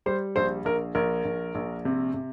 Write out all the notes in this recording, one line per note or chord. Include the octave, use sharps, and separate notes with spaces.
G3 C5
A#1 C5
A#1 A#4
A#1 A#4
A#1
A#1
C3
C3